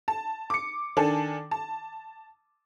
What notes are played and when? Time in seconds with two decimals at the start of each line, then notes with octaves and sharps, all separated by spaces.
0.08 A5
0.50 D6 C#7
0.97 D#3 D4 A4 G#5 A5
1.51 A5